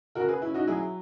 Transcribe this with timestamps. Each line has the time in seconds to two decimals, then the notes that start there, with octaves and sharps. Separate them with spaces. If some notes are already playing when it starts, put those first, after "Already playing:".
0.15 C#3 F#4 A#4
0.29 G#4 B4
0.41 C#4 E4
0.54 D#4 F#4
0.67 F#3 E4 G#4